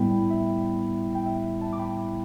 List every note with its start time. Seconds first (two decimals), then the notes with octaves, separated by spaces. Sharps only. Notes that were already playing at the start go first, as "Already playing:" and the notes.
Already playing: A2 G3 B3 E4 G5 B5
0.30 E5
1.15 G5
1.26 E5
1.61 E5 A5
1.73 D6
1.79 G5 B5